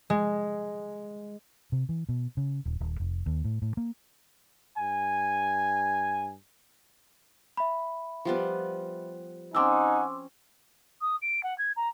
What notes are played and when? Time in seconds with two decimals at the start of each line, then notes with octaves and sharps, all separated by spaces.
0.10 G#3
1.72 C3
1.89 E3
2.09 B2
2.37 C#3
2.66 D#1
2.80 D#1
3.00 F1
3.26 D#2
3.44 A2
3.62 A2
3.77 A#3
4.77 G2 G#5
7.57 E5 B5
8.25 F3 G3 B3
9.55 C4 C#4 D#4 F#5 G#5 C6 D6 E6
11.01 D#6
11.21 D7
11.43 F#5
11.58 G#6
11.76 A#5